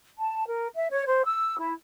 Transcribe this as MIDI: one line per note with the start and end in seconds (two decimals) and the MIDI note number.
0.17 0.45 81
0.46 0.66 70
0.75 0.86 76
0.90 1.02 73
1.05 1.21 72
1.24 1.57 88
1.58 1.73 64